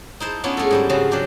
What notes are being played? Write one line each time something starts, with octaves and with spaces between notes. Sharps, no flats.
D#4 E4 C5 A5
B3 C#4 D4 E4 F4
G#3 A3 G#4 A4
G#2 G3 E4
C#3 F3 C4 C#4 F#4
F#3 D4 G4 A4